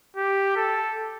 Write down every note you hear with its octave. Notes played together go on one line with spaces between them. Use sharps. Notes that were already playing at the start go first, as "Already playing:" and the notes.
G4
A4